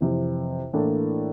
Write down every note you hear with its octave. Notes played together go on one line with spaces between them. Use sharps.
F2 C3 E3
A2 E3 A#3 D4 A4